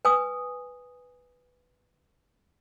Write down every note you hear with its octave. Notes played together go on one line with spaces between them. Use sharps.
B4 G#5 D#6